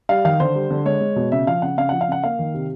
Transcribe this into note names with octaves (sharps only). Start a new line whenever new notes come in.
G3 F5
D#3 F5
D3 C5
G3
D3
G#3 C#5
G#3
B2
C#3 E5
F3 F5
C#3 F#5
C#3 F5
F3 F#5
F5
C#3 F#5
A#3 F5
D#3
C3